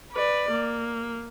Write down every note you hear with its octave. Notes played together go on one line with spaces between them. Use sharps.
B4 D5
A#3